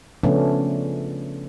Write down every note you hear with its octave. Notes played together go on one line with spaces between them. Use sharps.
C#3 F3 A3 B3 C#4 D4